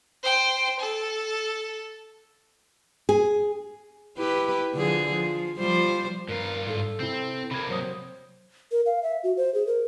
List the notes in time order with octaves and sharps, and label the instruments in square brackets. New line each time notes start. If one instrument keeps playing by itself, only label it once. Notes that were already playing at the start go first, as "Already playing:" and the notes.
[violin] C5 G5
A4
[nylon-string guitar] G#4
[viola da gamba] E4 G4 B4
D3 F3 G#4
F3
F3 G3 C5
[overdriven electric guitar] G2 F4 [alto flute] A#4
[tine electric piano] G#2 [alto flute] A4
[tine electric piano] C3 E4 [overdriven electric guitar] C4
[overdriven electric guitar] C3 A#3 [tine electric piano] B5 G#6
[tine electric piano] F#3 D#6 [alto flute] C5
[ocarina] A#4
F5
E5
F#4
C5
G#4
A#4